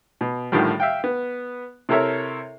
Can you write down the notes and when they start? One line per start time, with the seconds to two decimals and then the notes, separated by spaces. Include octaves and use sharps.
0.21 B2
0.52 G#1 A2 D3 D#3 F3 G3
0.80 E5 F5 G5
1.04 B3
1.89 C3 E4 A4 A#4 C#5 E5